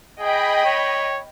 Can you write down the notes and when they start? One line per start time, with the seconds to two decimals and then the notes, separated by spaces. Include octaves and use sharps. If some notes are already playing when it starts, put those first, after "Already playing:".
0.20 G#4 D#5 G5 B5
0.65 C#5